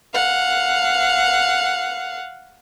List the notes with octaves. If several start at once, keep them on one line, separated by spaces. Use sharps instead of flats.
F5 F#5